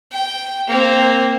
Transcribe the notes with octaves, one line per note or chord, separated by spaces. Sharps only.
G5
A#3 C4